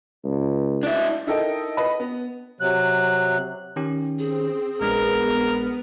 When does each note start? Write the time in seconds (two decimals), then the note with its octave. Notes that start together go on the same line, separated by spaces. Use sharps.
0.24 C#2
0.83 D4 E4
1.27 D#4 E4 A4 A#4 D#5 G5
1.77 B4 D#5 B5
2.00 B3
2.60 C3 F#3 F#6
3.76 D#3 C#4 G4
4.19 C4 G#4
4.81 A#1 G#3 B3 D4 A#4